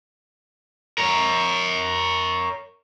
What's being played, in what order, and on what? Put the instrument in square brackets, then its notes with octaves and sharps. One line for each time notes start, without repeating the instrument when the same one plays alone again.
[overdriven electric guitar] A#4 C#5